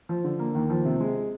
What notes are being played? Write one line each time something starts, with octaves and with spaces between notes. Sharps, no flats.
F3
D3
A#3
D#2
F3
C3
G#3